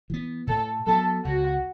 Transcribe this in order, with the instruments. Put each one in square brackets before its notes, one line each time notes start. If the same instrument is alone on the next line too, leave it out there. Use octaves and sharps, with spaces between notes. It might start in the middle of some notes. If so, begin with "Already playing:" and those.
[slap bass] E3 B3
[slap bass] A2 [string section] A4
[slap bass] F#3 B3 [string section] A4
[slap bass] C#2 [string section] F#4